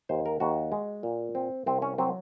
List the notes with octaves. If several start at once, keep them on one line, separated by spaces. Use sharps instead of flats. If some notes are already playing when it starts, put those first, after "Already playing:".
D#2 C5
A#4
D#2 F#4
G#3
A#2
C4
C2 C4
C#4
F#3 C4